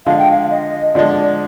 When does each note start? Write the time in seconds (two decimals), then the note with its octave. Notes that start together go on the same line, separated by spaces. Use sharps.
0.06 D3 F3 G#3 F5
0.19 G5
0.31 F5
0.42 F5
0.51 D#5
0.94 D3 F3 G#3 D5